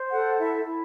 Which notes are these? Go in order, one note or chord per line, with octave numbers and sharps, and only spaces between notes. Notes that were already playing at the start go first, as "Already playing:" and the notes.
Already playing: C5
A4 F#5
E4 E5
E4